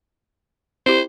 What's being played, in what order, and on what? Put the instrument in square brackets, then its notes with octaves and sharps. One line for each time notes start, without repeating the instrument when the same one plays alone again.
[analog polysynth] C4 E4 G4 [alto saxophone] C5